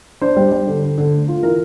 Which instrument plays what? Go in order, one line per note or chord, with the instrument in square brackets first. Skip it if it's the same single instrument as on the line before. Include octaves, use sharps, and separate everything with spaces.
[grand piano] D4 C5
G3
G3
D3
D3
D3
A3
F4
E3 A#4